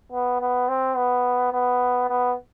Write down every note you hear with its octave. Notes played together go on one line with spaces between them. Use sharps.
B3
B3
C4
B3
B3
B3